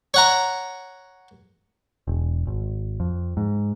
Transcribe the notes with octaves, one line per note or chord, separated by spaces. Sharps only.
C#5 F#5 A#5
E1
G#1
F2
G#2